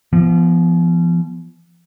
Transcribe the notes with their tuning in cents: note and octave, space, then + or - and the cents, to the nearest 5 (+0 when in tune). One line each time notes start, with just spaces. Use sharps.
F3 -35 B3 +0